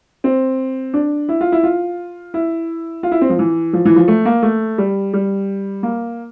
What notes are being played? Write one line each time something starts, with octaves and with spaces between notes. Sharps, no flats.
C4
D4
E4
F4
E4
F4
E4
F4
E4
C4
F3
E3
F3
E3
F3
A3
A#3
A3
G3
G3
A#3